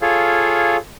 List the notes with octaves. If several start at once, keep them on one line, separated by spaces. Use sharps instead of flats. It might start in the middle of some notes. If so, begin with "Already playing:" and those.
F4 G#4 A4 C#5 F5